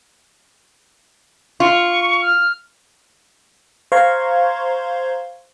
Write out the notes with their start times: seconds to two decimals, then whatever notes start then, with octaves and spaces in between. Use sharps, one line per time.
1.60 F4 C#6
2.22 F6
3.92 C5 F5 A#5 C6 C#6 G#6